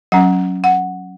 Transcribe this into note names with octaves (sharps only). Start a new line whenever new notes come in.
F#3 C#4 F#5
F#5